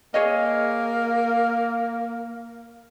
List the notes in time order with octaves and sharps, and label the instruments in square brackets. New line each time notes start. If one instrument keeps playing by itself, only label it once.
[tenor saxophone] A#3 [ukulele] G#4 C#5 D#5